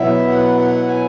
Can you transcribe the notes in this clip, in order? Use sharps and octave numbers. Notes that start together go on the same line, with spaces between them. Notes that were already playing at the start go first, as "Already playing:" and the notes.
Already playing: B2 F#3 B3 E4 E5
F#5
F#5
G#5